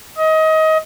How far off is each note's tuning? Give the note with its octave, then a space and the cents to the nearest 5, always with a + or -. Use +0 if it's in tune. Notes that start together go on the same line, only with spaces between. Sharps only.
D#5 +25